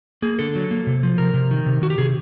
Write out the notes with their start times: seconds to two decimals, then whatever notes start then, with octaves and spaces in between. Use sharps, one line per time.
0.22 A#3 G#4
0.39 D3 A4
0.55 F#3
0.71 A#3
0.87 C3
1.03 F3
1.18 C3 A#4
1.34 C3
1.51 D#3
1.66 C3
1.82 D#3 F#4
1.90 G4
1.98 C3 G#4